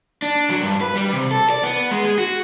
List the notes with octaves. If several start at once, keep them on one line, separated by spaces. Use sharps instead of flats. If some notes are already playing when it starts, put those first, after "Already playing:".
D4
F#3
G2
B4
G3
C3
A4
D5
B3
G#3
G#4
F#4